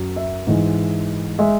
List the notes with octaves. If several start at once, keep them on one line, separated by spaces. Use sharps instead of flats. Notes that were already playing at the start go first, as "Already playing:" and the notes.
Already playing: F#2 F#3
E5
G#2 E3 G#3
G#3 E5